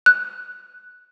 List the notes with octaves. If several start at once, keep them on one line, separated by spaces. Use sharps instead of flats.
F#6